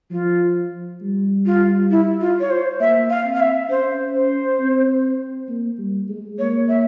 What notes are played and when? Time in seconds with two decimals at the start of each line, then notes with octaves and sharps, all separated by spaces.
0.11 F3 F4
1.02 G3
1.46 F4
1.90 E4
2.21 F4
2.40 C#5
2.50 C5
2.80 A#3 E5
3.10 F5
3.25 C4
3.35 F5
3.40 E5
3.69 C#4 C5
4.15 C5
4.60 C4
5.49 A#3
5.78 G3
6.09 G#3
6.39 A#3 C#5
6.69 E5